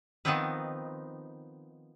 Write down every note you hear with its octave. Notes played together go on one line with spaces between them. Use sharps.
D#3 F3 B3 C4 D#4 B4